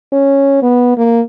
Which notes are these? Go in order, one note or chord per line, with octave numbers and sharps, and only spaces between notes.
C#4
B3
A#3